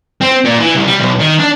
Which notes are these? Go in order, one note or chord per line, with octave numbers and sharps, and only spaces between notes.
C4
A#2
E3
C2
G3
B1
D#3
D4